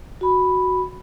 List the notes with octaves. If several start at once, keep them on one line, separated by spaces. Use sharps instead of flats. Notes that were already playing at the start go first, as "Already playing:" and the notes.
F#4 B5